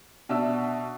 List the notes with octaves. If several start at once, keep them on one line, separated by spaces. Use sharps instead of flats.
B2 D4 E5 E6